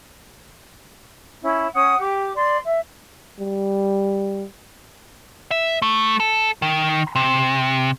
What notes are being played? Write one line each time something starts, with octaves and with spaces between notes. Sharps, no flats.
C#4 E4
C#4 F#5 D#6
G4 D6
D5 C6
E5
G3
E5
A3
A4
D#3
C3